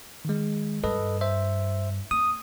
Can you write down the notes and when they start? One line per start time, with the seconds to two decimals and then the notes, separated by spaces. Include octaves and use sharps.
0.25 D#3 G#3
0.84 G2 A4 B4 D#5
1.21 C5 E5
2.11 A#3 D#6